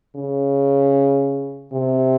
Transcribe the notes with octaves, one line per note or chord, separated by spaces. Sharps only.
C#3
C3